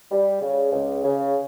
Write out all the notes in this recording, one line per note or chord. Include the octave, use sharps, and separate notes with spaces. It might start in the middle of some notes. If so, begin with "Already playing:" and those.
G3
C#3
C#2
C#3